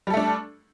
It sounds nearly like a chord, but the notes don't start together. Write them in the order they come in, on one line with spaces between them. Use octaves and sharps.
G3 A4 A3 D4